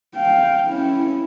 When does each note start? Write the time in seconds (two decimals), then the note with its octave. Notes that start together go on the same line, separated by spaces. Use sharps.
0.16 F5 G5
0.68 C#4 E4